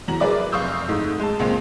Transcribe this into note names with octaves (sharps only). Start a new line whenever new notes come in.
E2 F#3 A#5 F#7
G#4 A#4 B4 D5 E5 D6
F1 F5 C#6 D#6 E6 G6
G#2 A3
G#3 A5
G#1 C#2 A#2 G#3 C4